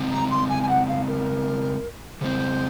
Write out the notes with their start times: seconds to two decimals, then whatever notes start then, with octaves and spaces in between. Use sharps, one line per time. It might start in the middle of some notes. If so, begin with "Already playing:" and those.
Already playing: C#3 G#3 C4 D#4
0.11 A#5
0.30 C6
0.49 G#5
0.63 G#5
0.69 F#5
0.88 F5
1.07 A#4
2.21 C#3 G#3 C4 C5